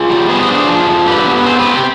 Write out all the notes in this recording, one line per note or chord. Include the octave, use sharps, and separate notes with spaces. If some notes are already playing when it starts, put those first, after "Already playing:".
Already playing: F4 G#4
G3
B3 G#4 C5
D4
F3
F2
D3 G4 B4
B3
C4 G#4 C5
G4 B4
C4
G4